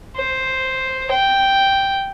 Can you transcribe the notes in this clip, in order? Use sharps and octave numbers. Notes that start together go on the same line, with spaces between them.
C5
G5